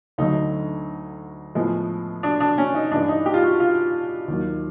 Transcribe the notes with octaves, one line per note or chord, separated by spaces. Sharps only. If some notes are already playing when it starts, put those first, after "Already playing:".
D2 D3 F#3 D#4
A2 F3 G#3 B3
D4
D4
C#4
D#4
G2 E3 G#3 D4
D#4
G4
F4
F#4
F4
D#2 D#3 F#3